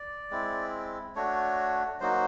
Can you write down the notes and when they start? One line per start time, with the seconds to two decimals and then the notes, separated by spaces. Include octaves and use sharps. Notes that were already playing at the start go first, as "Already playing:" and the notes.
Already playing: D5
0.31 G#3 C4 E4
1.15 A3 D4 F#4 C#5
2.00 F#3 A#3 D#4 F#4 C5